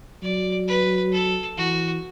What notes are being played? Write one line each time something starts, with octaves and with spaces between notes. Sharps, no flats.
F#3 D5
B4
A4
E3 F#4